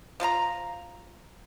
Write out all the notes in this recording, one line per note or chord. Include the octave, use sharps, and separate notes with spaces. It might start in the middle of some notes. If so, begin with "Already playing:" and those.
F3 F4 A4 A#5